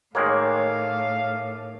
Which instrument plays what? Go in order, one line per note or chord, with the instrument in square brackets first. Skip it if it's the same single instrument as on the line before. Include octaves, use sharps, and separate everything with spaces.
[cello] A2 [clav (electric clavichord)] D#3 G#3 A#3 [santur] C#5 D5 [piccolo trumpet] F5